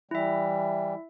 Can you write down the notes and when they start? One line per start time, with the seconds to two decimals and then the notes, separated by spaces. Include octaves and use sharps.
0.11 E3 G3 E4 E5